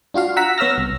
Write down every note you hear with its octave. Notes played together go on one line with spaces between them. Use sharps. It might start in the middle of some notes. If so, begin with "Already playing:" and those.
D4 F4 F#4 F5
F#5 A#5 E6 B6
B3 C#5 E6 F6 A#6
C2